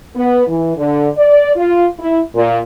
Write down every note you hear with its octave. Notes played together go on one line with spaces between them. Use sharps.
B3
E3
D3
D5
F4
E4
A#2